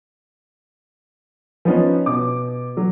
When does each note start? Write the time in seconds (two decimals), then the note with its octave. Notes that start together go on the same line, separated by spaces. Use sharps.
1.65 F3 B3 C#4 D#4
2.06 B2 D6
2.77 F#3